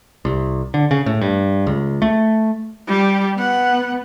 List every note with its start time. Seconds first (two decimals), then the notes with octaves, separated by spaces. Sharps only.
0.25 C2
0.74 D3
0.91 C#3
1.06 A2
1.21 G2
1.67 C#2
2.02 A3
2.87 G3 G4
3.38 B3 F#5